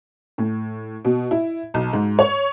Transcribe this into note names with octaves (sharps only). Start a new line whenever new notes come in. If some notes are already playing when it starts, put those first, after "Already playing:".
A2
B2
E4
B1
G#2
C#5